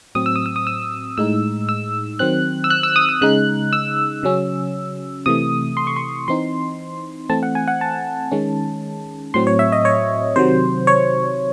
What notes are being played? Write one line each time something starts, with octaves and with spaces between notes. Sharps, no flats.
A2 F#3 C4 D#6
E6
D#6
E6
D#6
E6
A2 G#3 D#4 E6
E6
D#3 F#3 C4 F#6
E6
F#6
E6
D#6
E6
C#3 G#3 D#4 F#6
E6
C#3 F#3 C#4
C3 E3 A3 D#6
C6
C#6
C6
E3 C4 D#4 C6
E3 A3 C4 A5
F#5
G#5
F#5
A5
D#3 G#3 C#4
A2 F#3 C4 C6
C#5
E5
D#5
C#5
C3 D#3 F#3 C5
C#5